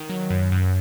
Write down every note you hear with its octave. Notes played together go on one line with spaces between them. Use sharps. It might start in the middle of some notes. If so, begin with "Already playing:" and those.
Already playing: D#3
F#3
F#2
F#2